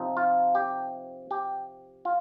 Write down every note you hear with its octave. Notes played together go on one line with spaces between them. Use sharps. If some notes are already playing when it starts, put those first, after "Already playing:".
Already playing: C3 F3 C4 D#4
F4
G4
G4
F4